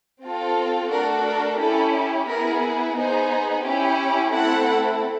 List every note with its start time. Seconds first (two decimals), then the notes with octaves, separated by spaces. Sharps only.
0.24 C4 F4 A4
0.92 A3 D4 F#4 A4 A#4
1.27 A#4
1.60 C#4 E4 G4 A4
2.28 B3 E4 G#4 A#4
2.97 B3 D#4 G#4 C5
3.65 C#4 E4 G4
4.33 A3 C4 E4 A4 F#5